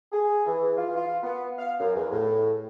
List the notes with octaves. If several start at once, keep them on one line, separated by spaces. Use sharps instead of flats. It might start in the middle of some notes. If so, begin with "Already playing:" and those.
G#4
E3
F4
F4
B3
F5
F#2
E2
A2